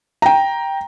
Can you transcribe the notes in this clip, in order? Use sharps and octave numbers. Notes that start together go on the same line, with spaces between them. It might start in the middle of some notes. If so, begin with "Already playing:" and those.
G5 A#5